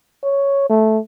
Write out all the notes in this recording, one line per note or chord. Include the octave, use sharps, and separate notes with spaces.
C#5
A3